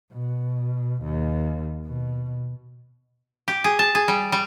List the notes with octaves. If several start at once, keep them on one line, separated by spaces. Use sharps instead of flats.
B2
D#2
B2
G4
G#4
A5
G#4
G3
G3